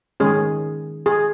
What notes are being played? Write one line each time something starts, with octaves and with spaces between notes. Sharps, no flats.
D#3 G#3 C#4 G#4
G#4